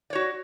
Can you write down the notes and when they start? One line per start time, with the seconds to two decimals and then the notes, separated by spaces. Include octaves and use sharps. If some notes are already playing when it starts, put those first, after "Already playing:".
0.10 D5
0.13 C#5
0.15 F#4